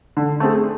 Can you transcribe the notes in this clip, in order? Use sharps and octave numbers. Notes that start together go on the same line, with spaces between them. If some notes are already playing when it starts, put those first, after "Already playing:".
D3
A3 C4 G#4